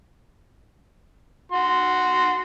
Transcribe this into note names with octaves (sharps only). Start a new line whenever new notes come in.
F#4 C6